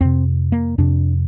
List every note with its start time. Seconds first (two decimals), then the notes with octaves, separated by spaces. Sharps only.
0.01 F2 C3 C4
0.52 A#3
0.78 F2 C3 D4